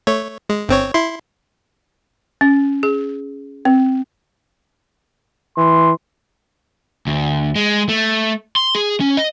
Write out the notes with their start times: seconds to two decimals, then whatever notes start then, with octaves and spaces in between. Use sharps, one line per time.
0.07 A3 C#5
0.49 G#3
0.69 G1 C4 C#5
0.94 E4 C6
2.41 C#4
2.83 G#4
3.65 C4
5.57 E3 C6
7.07 D2
7.56 G#3
7.89 A3
8.56 C6
8.75 G#4
9.00 C#4
9.17 D#5